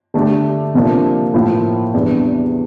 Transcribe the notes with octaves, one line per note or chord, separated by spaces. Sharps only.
D3 A3 D4 G4
C3 F3 A#3 D4
A2 F3 A#3 E4
E2 C3 E3 G3 D4